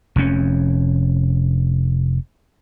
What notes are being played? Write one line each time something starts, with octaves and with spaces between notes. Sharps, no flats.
F1 F2 C#4